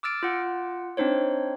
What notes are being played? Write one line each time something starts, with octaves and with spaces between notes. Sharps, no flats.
D6 E6 F6 A6 D7
F4 F#5
C4 D4 D#4 C5 C#5